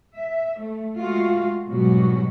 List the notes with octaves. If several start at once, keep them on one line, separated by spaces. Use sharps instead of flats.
E5
A3
G#3 A3 F4 F#4 F5
G#2 B2 F#3 G3 F#4